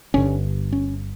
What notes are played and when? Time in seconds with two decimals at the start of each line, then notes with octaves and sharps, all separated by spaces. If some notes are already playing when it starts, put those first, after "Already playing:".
0.14 G1 G2 D3 C#4
0.73 C#4